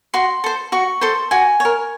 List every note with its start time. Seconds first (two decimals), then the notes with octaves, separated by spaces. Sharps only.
0.14 F#4 C6
0.44 A4 C5
0.72 F#4 C#6
1.01 A4 C5 C6
1.31 F#4 G#5
1.60 A#4 C#5